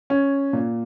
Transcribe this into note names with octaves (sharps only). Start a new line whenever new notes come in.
C#4
A#2